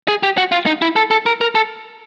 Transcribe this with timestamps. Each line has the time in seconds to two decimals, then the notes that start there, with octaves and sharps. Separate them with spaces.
0.08 G#4
0.23 G4
0.38 F#4
0.52 F4
0.66 D#4
0.82 E4
0.96 A4
1.11 A4
1.26 A#4
1.41 A#4
1.55 A4